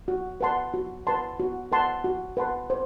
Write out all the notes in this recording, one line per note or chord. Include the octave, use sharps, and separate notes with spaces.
F#4
B4 F#5 A5 C6
F#4
B4 F#5 A5 C6
F#4
B4 F#5 A5 C6
F#4
B4 F#5 A5 C6
C5